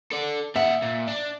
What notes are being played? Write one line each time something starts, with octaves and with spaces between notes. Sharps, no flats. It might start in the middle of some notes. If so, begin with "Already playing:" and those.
A4 D5
A#2 E5 F#5
A#2
D4